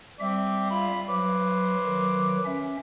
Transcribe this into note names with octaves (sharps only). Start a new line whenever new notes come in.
G3 C4 E5 D6
F4 B5
F#3 B4 C5 D6
D#3 F#3
C#4 E5